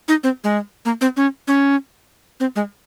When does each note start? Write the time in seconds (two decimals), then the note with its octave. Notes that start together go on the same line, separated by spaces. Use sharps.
0.08 D#4
0.24 C4
0.44 G#3
0.85 A#3
1.01 C4
1.17 C#4
1.48 C#4
2.40 C4
2.56 G#3